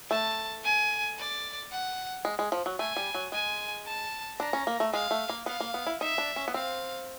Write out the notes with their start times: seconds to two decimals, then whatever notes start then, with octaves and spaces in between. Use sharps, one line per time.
0.10 A3 A5
0.64 G#5
1.19 D5
1.72 F#5
2.25 G#3
2.39 G#3
2.52 F3
2.66 F#3
2.79 A3 G#5
2.97 G3
3.14 F#3
3.32 G#3 G#5
3.86 A5
4.40 D4 A#5
4.53 C#4
4.67 A#3
4.80 A3
4.93 G#3 F5
5.11 A3
5.29 A#3
5.46 B3 F5
5.60 A#3
5.74 B3
5.87 E4
6.01 D#4 E5
6.18 D4
6.36 C#4
6.48 B3
6.54 C4 F5